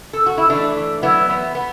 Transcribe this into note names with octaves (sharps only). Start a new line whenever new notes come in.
A4
F#4
E4
E3 A3 D4
E3
F#3 B3 E4
E2 B3
B3